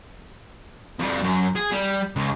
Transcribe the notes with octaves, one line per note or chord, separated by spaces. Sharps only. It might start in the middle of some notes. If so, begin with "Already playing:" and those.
F2 G3
F#2
G#4
G3
C#2